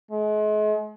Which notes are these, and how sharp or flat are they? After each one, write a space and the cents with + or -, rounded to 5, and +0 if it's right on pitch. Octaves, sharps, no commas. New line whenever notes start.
G#3 +40